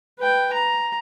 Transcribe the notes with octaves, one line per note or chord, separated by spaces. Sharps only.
B4 G5
A#5